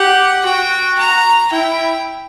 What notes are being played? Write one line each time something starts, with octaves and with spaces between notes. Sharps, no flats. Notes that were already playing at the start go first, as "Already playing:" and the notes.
Already playing: G4 F#5
F#4 G5
A#5
E4 G5